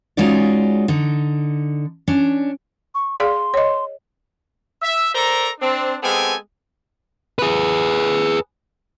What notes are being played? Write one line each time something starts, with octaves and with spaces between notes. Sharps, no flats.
G#3 C#4 D#4 F4 F#4 D5
D3 D#4
C#4 D4
C#6
G#4 D5 F5 C6
C#5 D#5
E5
A4 A#4 C5 D5 A#5
C4 D4
G#3 B3 C4 G4 A4 G#5
G#4 B4